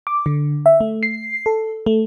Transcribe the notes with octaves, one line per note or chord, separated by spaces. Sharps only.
D6
D3
E5
A3
C7
A4
A3